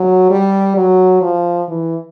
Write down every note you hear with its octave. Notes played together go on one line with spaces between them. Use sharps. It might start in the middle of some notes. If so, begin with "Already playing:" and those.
Already playing: F#3
G3
F#3
F3
E3